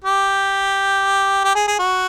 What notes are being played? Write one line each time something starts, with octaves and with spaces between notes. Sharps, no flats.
G4
G4
G#4
G#4
F#4